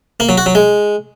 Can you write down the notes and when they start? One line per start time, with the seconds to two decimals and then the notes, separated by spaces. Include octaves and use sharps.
0.20 A#3
0.29 F#3
0.38 F#4
0.46 F#3
0.55 G#3